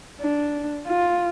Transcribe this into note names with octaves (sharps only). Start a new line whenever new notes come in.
D4
F4